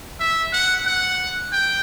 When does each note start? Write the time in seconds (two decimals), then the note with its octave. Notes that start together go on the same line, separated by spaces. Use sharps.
0.19 E5
0.53 F#5
0.86 F#5
1.52 G5